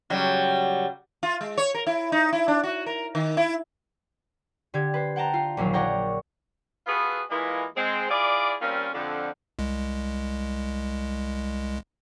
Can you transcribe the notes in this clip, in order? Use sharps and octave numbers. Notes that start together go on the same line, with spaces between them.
C#3 F#3 G3
F4
G#3
C#5
A#4
E4
D#4
E4
D4
F#4
A#4
D#3
E4
D3 G4 G#6
B4 C5
F#5 G5 A5 A#5
F4
A#1 D#2 F#3 F5
A#4 C#5 D5 F#5 G5 A#5
B3 F4 F#4 G#4 A4 B4
E3 G#3 A#3 E4 F4 D#5
G#3 C4
E4 F4 G#4 D5
G3 A#3 C4 C#4 F4
F2 D3
C2 G#3